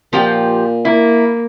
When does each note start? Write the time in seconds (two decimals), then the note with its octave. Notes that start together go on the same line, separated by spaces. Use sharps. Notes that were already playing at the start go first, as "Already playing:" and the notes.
0.13 A#2 F3 G4 G5
0.85 A#3 E4